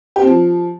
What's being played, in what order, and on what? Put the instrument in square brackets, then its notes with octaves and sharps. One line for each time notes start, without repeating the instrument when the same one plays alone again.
[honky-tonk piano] G4
C4
F3